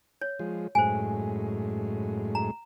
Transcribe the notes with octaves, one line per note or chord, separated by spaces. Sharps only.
C#5
F3 G#3
F#2 A2 G#3 C5 G#5
A#5